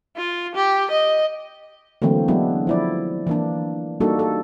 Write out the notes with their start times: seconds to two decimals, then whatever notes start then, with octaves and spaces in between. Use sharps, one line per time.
0.17 F4
0.55 G4
0.91 D#5
2.02 D3 E3 F#3 A3 A#3 C4
2.28 F#3 G#3 B3 D4 E4
2.67 F3 E4 D5
3.27 E3 A#3 D4
4.00 G3 A#3 D4 D#4 F#4 A4
4.19 A4